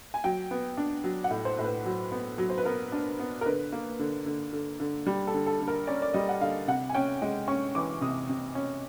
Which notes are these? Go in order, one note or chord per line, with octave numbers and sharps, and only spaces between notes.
G#5
F#3 G5
B3
D4
F#3
F#5
A2
C5
A2
B4
F#3
B3
F#3
C5
B4
B3 A#4
D4
B3
A#4
D3 B4
A#3
D3
D3
D3
D3
G3
A4
D3
A4
D3
A#4
C#4 D5
D5
G3 D#5
F#5
D3 F5
C3 F#5
G#5
C#4 G5
G#3
C#4 C#6
E3 D6
C3 D#6
C3
C#4